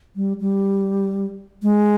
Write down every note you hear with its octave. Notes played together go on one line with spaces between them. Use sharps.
G3
G3
G#3